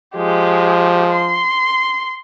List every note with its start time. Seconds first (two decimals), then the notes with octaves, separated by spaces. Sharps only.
0.16 F3 G#3 G4
1.12 C6